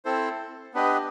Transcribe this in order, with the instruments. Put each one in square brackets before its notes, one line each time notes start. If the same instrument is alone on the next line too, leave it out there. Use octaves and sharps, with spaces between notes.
[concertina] C4 E4 A4 C5
B3 D4 G4 B4 D#5